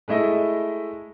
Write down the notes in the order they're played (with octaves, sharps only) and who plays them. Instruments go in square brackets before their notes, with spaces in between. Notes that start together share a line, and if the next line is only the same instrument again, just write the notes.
[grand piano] G#3 A3 E4 D#5 E5